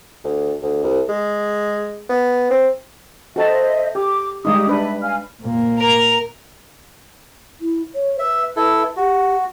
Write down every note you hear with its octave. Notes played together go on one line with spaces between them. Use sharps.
D2
D2
C2
G#3
B3
C4
F#4 A4 C5 D#5 E5 A5
G4 D6
G3 G#3 D#4 G4 D#6
D4 B4 E5
F5 G#5 F6
A#2 A#3
A#4 A#5
E4
C#5
B4 E5
E4 A4
F#4 G4